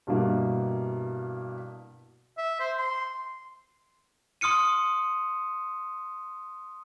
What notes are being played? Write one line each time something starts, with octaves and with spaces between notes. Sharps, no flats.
G2 B2 G3 A#3 E4
E5
C5
C6
C6 D#6 F6 C#7 D#7